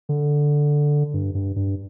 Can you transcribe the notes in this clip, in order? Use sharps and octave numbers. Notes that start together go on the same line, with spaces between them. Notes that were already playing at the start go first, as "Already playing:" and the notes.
D3
G2
G2
G2